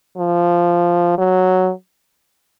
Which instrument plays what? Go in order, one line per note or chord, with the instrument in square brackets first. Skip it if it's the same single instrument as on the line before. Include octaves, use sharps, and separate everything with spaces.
[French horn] F3
F#3